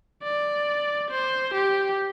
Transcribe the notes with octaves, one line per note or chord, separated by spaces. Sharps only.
D5
C5
G4